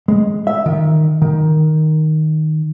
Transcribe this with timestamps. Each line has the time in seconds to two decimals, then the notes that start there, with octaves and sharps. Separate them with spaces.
0.08 G#3
0.47 E5
0.66 D#3
1.22 D#3